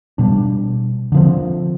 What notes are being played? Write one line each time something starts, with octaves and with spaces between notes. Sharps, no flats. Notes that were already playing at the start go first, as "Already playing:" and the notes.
B2 G3 D4
D3 F3 C4